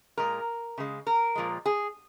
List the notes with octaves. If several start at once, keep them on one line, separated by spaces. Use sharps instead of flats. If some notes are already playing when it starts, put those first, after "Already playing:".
A#2 G#3 A#4
C#3 G#3
A#4
A#2 F3 G#3
G#4